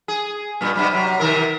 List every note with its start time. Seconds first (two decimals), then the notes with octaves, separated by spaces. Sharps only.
0.08 G#4
0.61 G2 A#2
0.76 G2 C3 G3
0.91 C3 F#3
1.20 C3 D#3 A#4